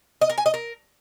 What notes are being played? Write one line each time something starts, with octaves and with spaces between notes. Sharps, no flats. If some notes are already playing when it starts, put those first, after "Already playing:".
D#5
A#4
G#5
D#5
A#4